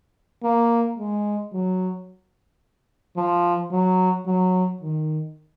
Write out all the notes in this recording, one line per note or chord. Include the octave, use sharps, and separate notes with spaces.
A#3
G#3
F#3
F3
F#3
F#3
D#3